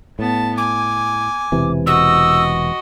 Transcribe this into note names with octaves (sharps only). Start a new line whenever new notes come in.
A2 B3 A5
G#5 D6
E1 C3 E3
F#4 D#5 E6